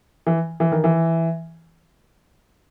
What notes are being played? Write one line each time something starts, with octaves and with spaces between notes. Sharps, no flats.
E3
E3
D#3
E3